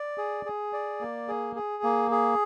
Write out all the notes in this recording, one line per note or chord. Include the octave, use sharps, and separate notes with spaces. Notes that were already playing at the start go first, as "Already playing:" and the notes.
Already playing: D5
G#4
G#4
D5
A#3
G#4
G#4
A#3
G#4